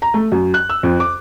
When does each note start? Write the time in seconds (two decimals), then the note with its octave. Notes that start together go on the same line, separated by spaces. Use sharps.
0.02 A#5
0.14 A3
0.32 F#2
0.54 F#6
0.70 E6
0.83 F2
1.00 D6